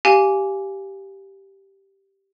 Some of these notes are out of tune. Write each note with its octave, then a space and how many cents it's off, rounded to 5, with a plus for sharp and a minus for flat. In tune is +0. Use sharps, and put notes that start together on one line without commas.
G4 -5 F5 -5 G#5 +0